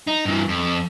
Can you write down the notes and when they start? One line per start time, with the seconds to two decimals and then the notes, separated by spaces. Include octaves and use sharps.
0.07 D#4
0.25 G2 E3
0.48 F2